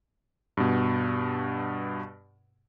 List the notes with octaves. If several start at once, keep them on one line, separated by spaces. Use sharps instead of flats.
G2 B2